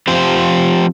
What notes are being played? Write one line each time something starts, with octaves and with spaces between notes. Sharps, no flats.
F3 C4 G4 C5